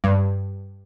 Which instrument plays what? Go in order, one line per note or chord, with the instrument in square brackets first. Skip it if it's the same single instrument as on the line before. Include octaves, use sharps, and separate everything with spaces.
[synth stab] G2